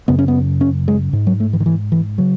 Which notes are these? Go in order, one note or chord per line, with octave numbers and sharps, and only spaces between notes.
F#2 C#3 B3
C#4
B3
C#4
G#3
G#2
F#3
A3
E3
D#3
E3
E3
C#3 F#3